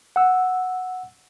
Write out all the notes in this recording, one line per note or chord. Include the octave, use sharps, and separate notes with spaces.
F#5 E6